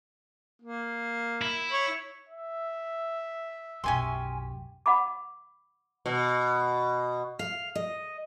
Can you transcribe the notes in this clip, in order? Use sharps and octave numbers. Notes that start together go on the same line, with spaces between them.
A#3
E4
C#5
E5
B1 F#2 C#4 G4 G5 G#5 C6
F#5 B5 D6
B2
F5
D#5